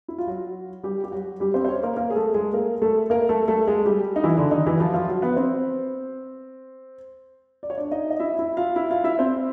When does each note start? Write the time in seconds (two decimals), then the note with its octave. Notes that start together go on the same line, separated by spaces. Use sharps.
0.08 E4
0.18 F4
0.27 F#3 F#4
0.83 G3 G4
1.04 G4
1.12 F#3 F#4
1.40 G3 G4
1.54 C4 C5
1.65 C5
1.68 C#4 C#5
1.83 A#3 A#4
1.97 A#3 A#4
2.10 G#4
2.16 A3 A4
2.34 G#3 G#4
2.53 A#3 A#4
2.82 A3 A4
3.10 A#3 A#4
3.29 A3 A4
3.48 A3 A4
3.67 G#3 G#4
3.86 G3 G4
4.16 D#4
4.24 E3 E4
4.38 D3 D4
4.51 D#3 D#4
4.66 E3 E4
4.80 F3 F4
4.94 F3 F4
5.08 F#3 F#4
5.22 B3 B4
5.36 C4 C5
7.63 D5
7.70 C#5
7.78 D4 D5
7.91 D#4 D#5
8.10 D#5
8.20 E4 E5
8.39 E4 E5
8.57 F4 F5
8.76 E4 E5
8.91 F4 F5
9.04 E4 E5
9.19 C4 C5